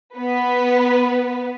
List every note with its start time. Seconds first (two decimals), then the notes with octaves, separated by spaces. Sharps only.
0.16 B3 B4